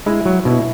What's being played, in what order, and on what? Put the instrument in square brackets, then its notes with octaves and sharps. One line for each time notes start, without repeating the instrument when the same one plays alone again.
[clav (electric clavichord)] G#3 [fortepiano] E4
[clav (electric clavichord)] F#3
[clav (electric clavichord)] B2 [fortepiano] E4